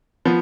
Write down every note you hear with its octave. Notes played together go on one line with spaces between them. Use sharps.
F3 B3